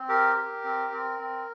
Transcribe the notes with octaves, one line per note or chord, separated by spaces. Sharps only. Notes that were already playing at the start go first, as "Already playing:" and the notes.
Already playing: C4
G4 A#4
G4
C4
C4
C4